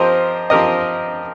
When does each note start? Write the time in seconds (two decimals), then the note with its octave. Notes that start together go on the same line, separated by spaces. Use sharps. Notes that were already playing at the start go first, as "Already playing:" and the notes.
Already playing: F3 C4 G4 A#4 C5 D#5
0.50 F3 C4 G4 A#4 D#5